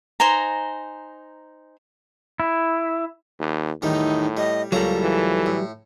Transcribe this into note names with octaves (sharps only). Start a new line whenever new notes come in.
D#4 C5 G#5 A#5
E4
D#2
E2 A2 D#3 G3 D#4
G3 D#5
C#2 F#3 G3 A#3 A4 A#5
E3
A2